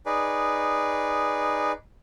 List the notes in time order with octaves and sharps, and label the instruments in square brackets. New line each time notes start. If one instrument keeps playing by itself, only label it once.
[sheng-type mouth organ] D#4 G#4 B4 D5